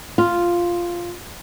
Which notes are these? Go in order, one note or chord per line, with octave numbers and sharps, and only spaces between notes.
F4